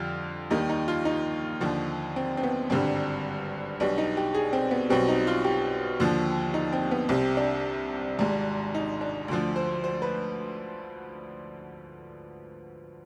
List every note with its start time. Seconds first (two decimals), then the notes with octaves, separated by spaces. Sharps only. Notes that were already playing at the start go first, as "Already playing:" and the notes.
Already playing: F2 D3 G3 F4
0.50 D#2 D#3 G3 D#4
0.69 D#4
0.88 F4
1.05 D#4
1.61 D#2 D3 F3
2.16 C4
2.37 C4
2.43 B3
2.70 G#1 G2 D3 G3 C4
3.80 B1 B2 G3 D4
3.98 D#4
4.17 G4
4.34 G#4
4.53 C4
4.71 B3
4.90 B1 B2 G3 C4
5.08 D#4
5.27 F4
5.44 G4
6.00 D#2 D3 F3
6.54 D#4
6.73 C4
6.91 B3
7.09 C2 C3 G3 C4
7.37 D4
8.19 G#1 G#2 G3
8.75 D#4
9.01 D4
9.28 D2 D3 F3
9.56 C5
9.84 C5
10.02 B4